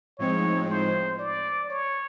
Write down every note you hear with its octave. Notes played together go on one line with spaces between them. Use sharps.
A2 F3 G#3 C4 D#4 C#5
C5
D5
C#5